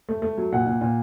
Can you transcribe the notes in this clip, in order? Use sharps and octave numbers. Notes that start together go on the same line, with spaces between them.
A3
A3
F#3
A#2 F#5
A#2
A#2